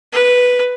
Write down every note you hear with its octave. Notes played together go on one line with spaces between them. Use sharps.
B4